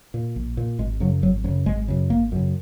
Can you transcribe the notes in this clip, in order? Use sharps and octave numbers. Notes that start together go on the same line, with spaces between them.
A#2
A#1
A#2
G#1 G#3
F#2 C#3 F#3
G#1 F#3
F#2 C#3 F#3
G#1 G#3
F#2 C#3
G#1 A#3
F#2 C#3